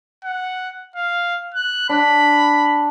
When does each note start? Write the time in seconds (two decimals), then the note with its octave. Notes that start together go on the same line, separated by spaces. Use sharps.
0.25 F#5
0.96 F5
1.54 F#6
1.89 D4 B5